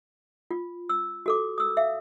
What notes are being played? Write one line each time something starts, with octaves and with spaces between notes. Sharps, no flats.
F4
E6
F#4 A4 D6
D#6 E6
E5 F5